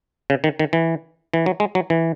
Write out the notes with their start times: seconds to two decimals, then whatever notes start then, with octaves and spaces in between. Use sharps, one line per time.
0.30 C#3
0.44 D#3
0.59 D#3
0.73 E3
1.34 E3
1.46 F#3
1.60 G#3
1.75 F#3
1.90 E3